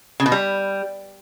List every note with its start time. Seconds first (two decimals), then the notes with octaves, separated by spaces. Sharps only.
0.20 C#3
0.26 B2
0.32 G3